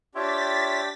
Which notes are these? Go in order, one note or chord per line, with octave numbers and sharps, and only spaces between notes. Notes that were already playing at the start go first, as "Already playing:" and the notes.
D4 F4 G4 C#5 E5 G5 A6 B6